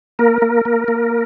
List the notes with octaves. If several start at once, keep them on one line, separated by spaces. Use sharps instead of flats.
A#3 A#4
A#3
A#3
A#3